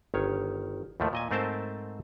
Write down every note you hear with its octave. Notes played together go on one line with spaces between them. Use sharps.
G1 D#3 C#5
D#2 A2 F3 A3
A#2 D#5 G#5
G#2 A3 C4 A#4 C5 A5